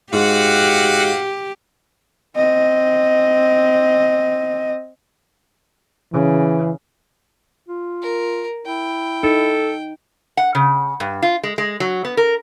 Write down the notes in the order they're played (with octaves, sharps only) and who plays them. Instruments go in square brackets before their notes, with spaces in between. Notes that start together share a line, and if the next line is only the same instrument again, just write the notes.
[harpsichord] G#2 [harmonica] F#4 F5 F#5 [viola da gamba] G4
[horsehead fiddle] C4 D#5
[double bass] C#3 [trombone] E3
[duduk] F4
[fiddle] A#4
[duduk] E4 [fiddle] G5
[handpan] D#4 [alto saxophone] A4
[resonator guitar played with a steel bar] F#5
C#3
G2
F4
G#3
G#3
F#3
B3
A#4